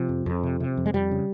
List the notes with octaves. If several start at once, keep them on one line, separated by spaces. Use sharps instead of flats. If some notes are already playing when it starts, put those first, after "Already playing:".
Already playing: C3 F3
F2
F2
C3
C3
F2
G#3
F2 G3
C#3